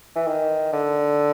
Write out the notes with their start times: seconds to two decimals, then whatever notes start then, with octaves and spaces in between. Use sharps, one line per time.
0.16 E3
0.27 D#3
0.73 D3